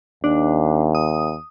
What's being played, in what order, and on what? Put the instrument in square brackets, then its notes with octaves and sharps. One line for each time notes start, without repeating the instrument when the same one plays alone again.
[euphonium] D#2 [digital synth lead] D4
[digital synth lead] D#6